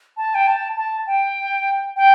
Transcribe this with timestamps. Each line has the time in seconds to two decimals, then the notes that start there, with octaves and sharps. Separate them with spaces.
0.17 A5
0.35 G5
0.47 A5
0.76 A5
1.07 G5
1.96 G5